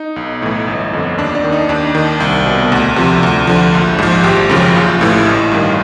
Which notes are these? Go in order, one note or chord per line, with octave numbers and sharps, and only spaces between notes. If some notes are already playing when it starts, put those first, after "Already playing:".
Already playing: D#4
B1
A2 E3
G1
F2 D3
D#2 D4
D4
D#3
D#4
D#2 D4
D#3
C2
B2
D2
C3 F3
D2
D3 F3
A#1
G#2 F3
G#1 G4
F#2 C#3 F3
A#1 F4
A2 E3
A1
G2 D#3